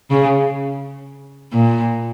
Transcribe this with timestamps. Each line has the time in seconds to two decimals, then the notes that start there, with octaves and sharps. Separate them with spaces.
0.10 C#3
1.53 A#2